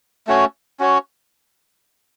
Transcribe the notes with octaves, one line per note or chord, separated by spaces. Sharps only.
A3 C#4 F#4 C#5
C#4 F#4 C#5